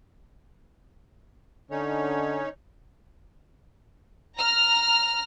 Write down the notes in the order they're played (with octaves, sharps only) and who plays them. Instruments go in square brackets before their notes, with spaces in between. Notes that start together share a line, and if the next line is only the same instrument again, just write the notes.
[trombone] D3 [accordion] C#4 D#4 C#5
[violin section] A#5 F6